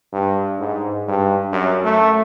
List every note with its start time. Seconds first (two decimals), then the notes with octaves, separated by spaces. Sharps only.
0.13 G2
0.60 G#2
1.08 G2
1.52 F#2
1.84 A3